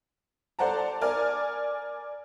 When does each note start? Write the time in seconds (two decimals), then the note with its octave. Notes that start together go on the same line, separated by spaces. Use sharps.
0.59 A4 C5 D5 F#5 A5 A#5
1.01 A#4 D5 G#5 F6